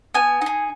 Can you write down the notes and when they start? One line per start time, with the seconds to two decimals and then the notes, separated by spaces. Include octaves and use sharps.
0.14 B3 G#5
0.42 D#4 G#4